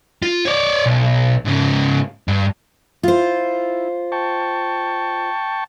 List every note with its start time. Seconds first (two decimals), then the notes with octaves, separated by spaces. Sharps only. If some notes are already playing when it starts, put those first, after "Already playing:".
0.23 F4
0.46 C#5 D5
0.86 B1
1.46 G#2 C#3
2.28 G2
3.03 E4 F4 C5
4.12 G5 A5 C#6